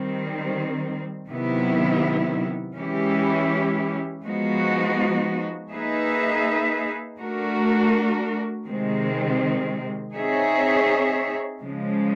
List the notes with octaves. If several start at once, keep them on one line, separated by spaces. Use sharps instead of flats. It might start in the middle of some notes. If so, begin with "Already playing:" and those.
Already playing: D#3 G3 C4
C3 D#3 F#3 B3 E4
E3 G#3 C#4 E4 G4
F3 G#3 B3 D#4 F#4
A#3 D#4 G#4 B4 E5
A3 D4 F#4 A#4
C3 D#3 G#3 C4
C4 D#4 G#4 C#5 E5
C#3 F3 G#3